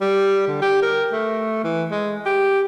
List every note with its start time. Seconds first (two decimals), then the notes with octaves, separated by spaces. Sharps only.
0.01 G3
0.47 D3
0.62 G4
0.82 A#4
1.12 A3
1.64 E3
1.91 G#3
2.26 G4